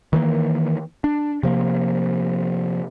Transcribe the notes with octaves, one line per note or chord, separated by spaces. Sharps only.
D#3 E3 A#3
D4
C3 F3 A#3